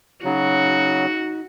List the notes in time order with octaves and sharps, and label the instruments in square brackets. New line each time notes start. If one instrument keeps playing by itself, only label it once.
[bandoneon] C#3 F#3 [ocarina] D#4 [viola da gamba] F#4